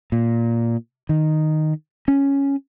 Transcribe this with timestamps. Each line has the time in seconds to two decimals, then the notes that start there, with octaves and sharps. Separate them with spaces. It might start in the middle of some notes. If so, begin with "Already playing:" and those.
0.12 A#2
1.09 D#3
2.08 C#4